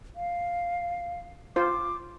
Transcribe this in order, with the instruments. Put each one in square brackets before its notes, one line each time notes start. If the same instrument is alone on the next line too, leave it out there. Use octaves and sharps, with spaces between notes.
[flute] F5
[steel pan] F4 C5 [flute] D6